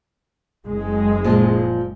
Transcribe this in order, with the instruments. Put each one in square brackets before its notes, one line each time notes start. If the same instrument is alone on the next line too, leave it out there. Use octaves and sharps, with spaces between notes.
[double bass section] F#1 G#3
[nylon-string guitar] A#2 F3